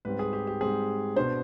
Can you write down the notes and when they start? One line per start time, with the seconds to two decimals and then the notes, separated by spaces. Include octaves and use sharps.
0.05 G#2 G3 C4 B4
0.19 G#4
0.33 G4
0.47 G4
0.61 G#2 G3 C4 G#4
1.16 B2 B3 D4 C5